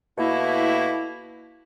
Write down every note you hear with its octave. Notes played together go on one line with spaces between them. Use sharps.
B2 A3 A#3 E4